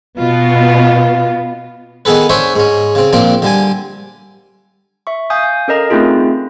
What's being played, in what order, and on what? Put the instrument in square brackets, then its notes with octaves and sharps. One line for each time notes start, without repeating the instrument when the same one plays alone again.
[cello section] B2 B3 [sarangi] F4
[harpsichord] D#3 B3 G#4 A4 B4
C#4 D4 C5 C#5 E5 F#5
G#2 C#4
C#3 C4
A#2 F3 C4 D4
D3 G3 G#5
[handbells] E5 C#6
F5 G#5 D#6 G6
C#4 A4 A#4 D#5 A#5
A3 C4 C#4 D#4 F4 G#4